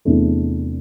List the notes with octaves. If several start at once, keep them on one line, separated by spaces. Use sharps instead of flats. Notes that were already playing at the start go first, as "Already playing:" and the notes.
E2 C3 E3 A3 D4